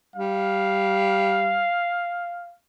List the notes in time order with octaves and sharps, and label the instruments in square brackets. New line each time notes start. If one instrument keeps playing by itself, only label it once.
[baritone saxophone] G3 [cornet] F5